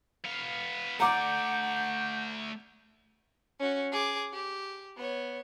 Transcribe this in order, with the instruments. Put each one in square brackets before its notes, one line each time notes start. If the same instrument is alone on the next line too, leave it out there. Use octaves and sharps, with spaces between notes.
[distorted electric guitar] B3 F5
[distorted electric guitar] A3 D5 [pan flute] F#5 [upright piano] A#5 D6 [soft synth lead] G6
[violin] C#4 F#4
G#4 D6
G4
B3 C#5